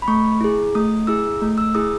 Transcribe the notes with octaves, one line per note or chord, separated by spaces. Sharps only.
B5
A3 C#6
E4 G#4
A3 D#6
E4 G#4 E6
A3
E6
E4 G#4 D#6